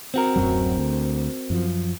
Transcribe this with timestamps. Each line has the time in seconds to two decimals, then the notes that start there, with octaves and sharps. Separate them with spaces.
0.14 C4 F#4 A#4
0.36 D1 F#2 F#3
0.78 D2
1.50 F#2 F3